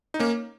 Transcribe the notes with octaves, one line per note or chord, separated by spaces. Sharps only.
D#4
A#3 C#4